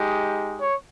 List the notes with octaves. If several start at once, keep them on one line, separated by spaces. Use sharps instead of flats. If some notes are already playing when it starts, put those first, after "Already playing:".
Already playing: G#3 D#4 G4
C#5